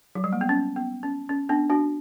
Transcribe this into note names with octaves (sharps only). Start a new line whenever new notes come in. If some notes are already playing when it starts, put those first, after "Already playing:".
F#3
G3
A#3
B3
C#4
B3
C#4
C#4
B3 D4
D4 F#4